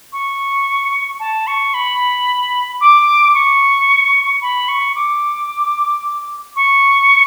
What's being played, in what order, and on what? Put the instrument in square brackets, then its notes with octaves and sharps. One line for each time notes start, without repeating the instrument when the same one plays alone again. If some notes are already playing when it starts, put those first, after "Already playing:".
[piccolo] C#6
A5
C#6
B5
D6
C#6
B5
C#6
D6
C#6